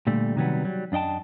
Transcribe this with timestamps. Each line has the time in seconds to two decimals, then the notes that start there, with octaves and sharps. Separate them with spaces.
0.07 A#2 D3 G3 A3
0.36 C3 D#3 F#3 G3 B3
0.65 F#3 G3
0.92 F#2 D4 D#5 G5 A5